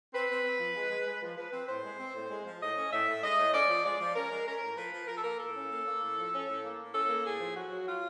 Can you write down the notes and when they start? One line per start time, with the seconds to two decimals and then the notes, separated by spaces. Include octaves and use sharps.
0.13 C4 B4
0.30 C4
0.45 C4
0.60 F3
0.75 G#3
0.91 G#3
1.07 G#3
1.22 F3
1.37 F3 B4
1.53 C4
1.68 A2 C5
1.84 G#3
1.99 C4
2.14 A2
2.31 G#3
2.46 F3
2.61 A2 D#5
2.77 C#4
2.92 A2 E5
3.08 A2
3.23 G#3 D#5
3.38 A2
3.53 C#4 D5
3.69 F3
3.85 G#3 D5
4.00 F3
4.15 C#4 A#4
4.30 G#3
4.46 C#4 A#4
4.62 A2
4.77 F3 B4
4.92 F3
5.08 F3 A#4
5.16 A4
5.24 A#3 A#4
5.39 A2 A4
5.55 C#4
5.70 A#3
5.85 A#3
6.01 A2
6.16 F3
6.32 C#4
6.47 A2
6.63 A#3
6.79 A2
6.94 C#4 A4
7.10 A#3
7.25 A2 G#4
7.40 F3
7.55 F#3 F#4
7.70 F#3
7.87 F4